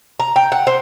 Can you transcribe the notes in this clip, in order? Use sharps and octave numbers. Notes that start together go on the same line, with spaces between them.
A#5
G5
F#5
C5